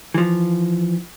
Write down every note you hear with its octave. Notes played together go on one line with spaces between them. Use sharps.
E3 F3